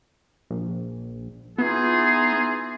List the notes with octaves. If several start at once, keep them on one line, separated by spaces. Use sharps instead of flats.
A#1
E3 B3 D#4 F4 G#4